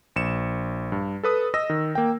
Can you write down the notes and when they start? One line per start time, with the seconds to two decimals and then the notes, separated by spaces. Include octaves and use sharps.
0.16 A#1 C#7 E7
0.92 G2
1.23 A4 B4 D#6
1.54 D#5 D#6 E6 A#6
1.70 D#3
1.95 A#3 G5